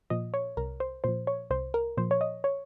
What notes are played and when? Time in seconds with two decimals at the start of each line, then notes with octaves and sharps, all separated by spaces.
0.10 A#2 F3 D#5
0.34 C#5
0.57 C2 A#4
0.80 C5
1.04 A#2 F3 C5
1.27 C#5
1.50 C2 C5
1.74 A#4
1.97 A#2 F3 C5
2.11 C#5
2.21 D#5
2.44 C#5